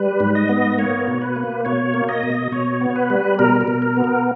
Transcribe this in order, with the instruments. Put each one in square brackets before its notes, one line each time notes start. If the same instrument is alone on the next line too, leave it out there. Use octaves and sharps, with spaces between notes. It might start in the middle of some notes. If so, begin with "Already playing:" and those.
Already playing: [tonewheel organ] G3 B4
G#2
D#5
B3
A#3 C#5
B2
B4
A#3
B2 C#5
A#3
D#5
B2
B2 C#5
B3
C#5
B4
G3
B2 A#4
A#4
B2
A#4
B3
A#4